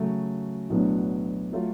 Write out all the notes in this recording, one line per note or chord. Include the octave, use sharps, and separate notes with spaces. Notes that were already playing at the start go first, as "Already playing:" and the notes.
Already playing: C#3 F#3 A3
B1 A2 F#3 B3 D4
F#3 A3 F4